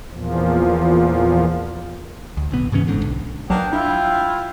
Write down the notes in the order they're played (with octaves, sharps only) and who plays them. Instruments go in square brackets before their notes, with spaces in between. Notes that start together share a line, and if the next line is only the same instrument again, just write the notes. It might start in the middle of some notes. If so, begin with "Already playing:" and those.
[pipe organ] E2 A#2 F3
[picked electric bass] D2
D1 B1 B3
G#2 C#3 E3 C#4
G1 G#2 D3
B1
[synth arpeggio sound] A#1 F#3 A5 [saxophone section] A#3 B3 D4 [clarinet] G5
[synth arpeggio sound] D4 [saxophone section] E4 F4